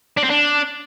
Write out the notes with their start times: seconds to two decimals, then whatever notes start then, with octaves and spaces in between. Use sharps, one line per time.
0.17 D4
0.23 C4
0.30 D4